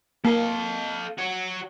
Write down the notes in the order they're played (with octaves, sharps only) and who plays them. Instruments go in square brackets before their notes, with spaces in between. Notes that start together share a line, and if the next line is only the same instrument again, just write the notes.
[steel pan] A#3 [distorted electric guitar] A4 F5
[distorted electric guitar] F#4 C#5